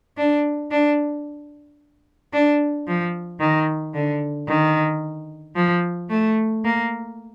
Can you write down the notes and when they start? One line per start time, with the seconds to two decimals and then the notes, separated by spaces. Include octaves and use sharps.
0.17 D4
0.71 D4
2.33 D4
2.87 F3
3.40 D#3
3.94 D3
4.48 D#3
5.56 F3
6.10 A3
6.64 A#3